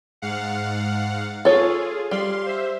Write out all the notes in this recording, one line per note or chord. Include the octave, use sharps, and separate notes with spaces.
G#2 F5 F#5
F4 G#4 A4 C#5
G3 F5 C6
C5 E5